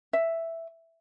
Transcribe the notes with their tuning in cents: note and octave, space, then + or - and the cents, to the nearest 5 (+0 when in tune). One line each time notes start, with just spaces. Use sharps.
E5 +5